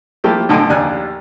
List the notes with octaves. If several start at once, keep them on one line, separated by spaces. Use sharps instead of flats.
F3 A3 A#3 E4 G4
B1 A2 D3 D#4 A4 G#5
A#1 D#2 D4 G4 G#5 F#6